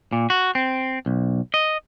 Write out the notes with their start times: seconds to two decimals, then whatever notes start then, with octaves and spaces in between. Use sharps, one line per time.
0.12 A#2
0.30 F#4
0.55 C4
1.06 B1
1.54 D#5